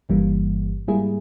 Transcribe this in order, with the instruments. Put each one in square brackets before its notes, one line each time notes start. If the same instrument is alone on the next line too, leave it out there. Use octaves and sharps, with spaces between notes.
[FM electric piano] G1 G2 E3 G3 A#3
G#2 G3 A#3 E4 G#4